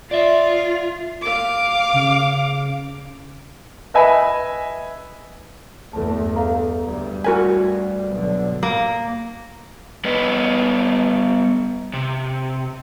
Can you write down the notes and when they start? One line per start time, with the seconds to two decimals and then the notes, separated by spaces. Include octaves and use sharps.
0.11 F4 D5 E5
1.22 F5 D6
1.93 C#3
3.94 B4 D#5 E5 G#5 B5
5.93 E2 G2 A3 A4 A5
6.36 A4 F5 A#5
6.84 D2 G2 G3
7.25 F#4 A#4 G#5
8.10 B1 D3
8.63 A#3
10.04 G3 B3 B4 D#5
11.93 C3